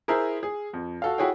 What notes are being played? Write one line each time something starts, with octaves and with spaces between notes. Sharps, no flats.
E4 G#4 A#4 C5 E5
G#4
F2
F#4 A4 F5
E4 F#4 G#4 C#5 G5